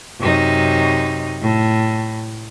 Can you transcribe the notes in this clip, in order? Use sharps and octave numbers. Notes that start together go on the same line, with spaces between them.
F#2 C3 D#4
A2